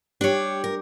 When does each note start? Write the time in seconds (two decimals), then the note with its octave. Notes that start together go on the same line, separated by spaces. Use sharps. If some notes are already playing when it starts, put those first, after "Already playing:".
0.21 G3 D4 G4 C#5
0.64 A#4